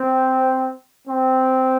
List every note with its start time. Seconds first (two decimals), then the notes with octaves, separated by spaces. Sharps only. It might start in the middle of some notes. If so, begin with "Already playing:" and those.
Already playing: C4
1.07 C4